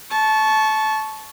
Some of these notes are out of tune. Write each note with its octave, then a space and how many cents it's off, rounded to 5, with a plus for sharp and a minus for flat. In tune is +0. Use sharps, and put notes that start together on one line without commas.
A5 -20 C#6 +0